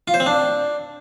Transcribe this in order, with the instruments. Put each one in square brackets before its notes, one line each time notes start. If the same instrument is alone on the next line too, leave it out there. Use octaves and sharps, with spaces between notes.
[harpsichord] F4
C5
C4
D4